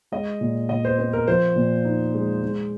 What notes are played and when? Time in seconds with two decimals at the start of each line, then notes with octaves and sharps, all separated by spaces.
0.12 G#3 D#5
0.41 A#2
0.69 A#2 D#5
0.85 C5
0.98 C4 C5
1.13 A#4
1.28 F3 C5
1.56 A#2
1.85 D#4
2.14 G#3
2.43 G#3